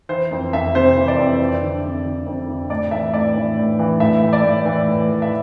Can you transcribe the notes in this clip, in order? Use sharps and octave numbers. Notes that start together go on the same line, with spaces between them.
E3 C5
F2
F2 E5
C3 C5
E3
D5
F2
F2
D3
F2
D3
F2
D3
A2 D5
E3 E5
A2 D5
E3
A2
E3
A2 E5
E3
D5
A2
E3
A2
E3
E5